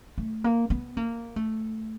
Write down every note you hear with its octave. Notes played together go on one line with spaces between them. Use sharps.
A3
A#3
B3
A#3
A3